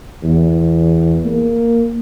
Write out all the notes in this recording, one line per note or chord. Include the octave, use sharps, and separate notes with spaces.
E2
A#3